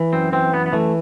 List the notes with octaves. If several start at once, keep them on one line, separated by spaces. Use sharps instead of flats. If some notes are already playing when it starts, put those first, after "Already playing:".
Already playing: E3
F#2 C4
E3 C4
F#2 B3
B3
E3 A3